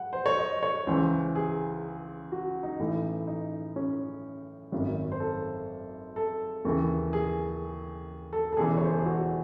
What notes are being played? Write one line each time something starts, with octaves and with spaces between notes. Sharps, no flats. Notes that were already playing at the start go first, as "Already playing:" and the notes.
Already playing: F#5
C5
C#5
D#5
C#5
C#2 C#3 E3 C5
G#4
F#4
D#4
A1 A2 E3
D#4
C#4
G#1 F#2 D#3
C5
A4
A4
D#2 C#3 E3
G#4
A4
A4
E1 E2 C#3 E3 G#4
C#5
C5
A4
G#4
F#4